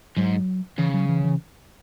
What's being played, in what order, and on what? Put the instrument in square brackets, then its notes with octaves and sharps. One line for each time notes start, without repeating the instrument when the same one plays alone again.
[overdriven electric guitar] G#2 [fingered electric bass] F#3
[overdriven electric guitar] C#3 [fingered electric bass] E3
[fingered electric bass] F#3
E3
E3